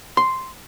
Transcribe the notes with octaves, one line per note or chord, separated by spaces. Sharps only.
C6